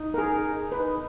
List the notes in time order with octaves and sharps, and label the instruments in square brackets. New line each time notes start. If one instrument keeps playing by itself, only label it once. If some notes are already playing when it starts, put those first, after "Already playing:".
Already playing: [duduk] D#4
[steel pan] A#4
G#4
[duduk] D#4 [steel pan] B4